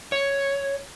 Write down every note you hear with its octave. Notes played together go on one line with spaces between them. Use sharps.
C#5